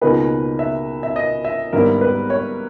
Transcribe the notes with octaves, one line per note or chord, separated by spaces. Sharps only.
C#2 B2 A#3 D#4 G#4 B4
E5
E5
D#5
E5
G#1 G#2 G3 B3 E4 A#4
B4
C#5